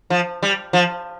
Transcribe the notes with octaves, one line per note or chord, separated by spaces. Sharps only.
F3
G3
F3